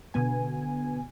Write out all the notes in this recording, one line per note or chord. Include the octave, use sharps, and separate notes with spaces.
B2 D3 B3 G#5